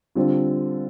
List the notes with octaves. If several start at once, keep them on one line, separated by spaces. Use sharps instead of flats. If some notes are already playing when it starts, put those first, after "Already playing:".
D3 G3 C4 F4